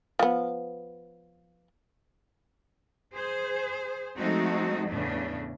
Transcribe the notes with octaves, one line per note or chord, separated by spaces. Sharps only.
F3 B3
G#4 C5
F3 G#3 A3 C4 D#4 F#4
E2 A2 C#3 A3 B3 D4